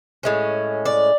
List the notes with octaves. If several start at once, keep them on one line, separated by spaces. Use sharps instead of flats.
A2 G#3 C#4
D5